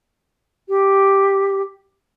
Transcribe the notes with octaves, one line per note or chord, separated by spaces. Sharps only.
G4